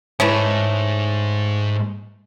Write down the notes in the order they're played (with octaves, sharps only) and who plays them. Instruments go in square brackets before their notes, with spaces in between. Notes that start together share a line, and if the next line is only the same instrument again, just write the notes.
[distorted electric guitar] G#2 [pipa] E3 A3 C#4